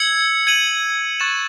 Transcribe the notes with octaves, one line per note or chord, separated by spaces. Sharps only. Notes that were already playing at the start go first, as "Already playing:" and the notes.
Already playing: E6 G#6 C#7 F#7
G#6 D#7 F#7
C#6 F#6 A6 E7